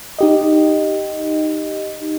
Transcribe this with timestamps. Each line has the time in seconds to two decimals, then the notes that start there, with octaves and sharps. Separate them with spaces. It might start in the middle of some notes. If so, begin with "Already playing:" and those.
0.19 D#4 G4 D#5